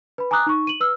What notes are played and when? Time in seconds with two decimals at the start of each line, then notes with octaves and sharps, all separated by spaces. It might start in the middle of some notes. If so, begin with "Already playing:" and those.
0.18 B4 B5
0.31 G#5 A#5 D6 D#6 F#6
0.46 D#4 C#6
0.67 D#7 F#7
0.80 B4 E6 F6